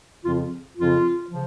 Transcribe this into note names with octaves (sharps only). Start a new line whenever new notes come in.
F2 C#3 F3 F4
F2 C#3 F3 F4
C#3 F3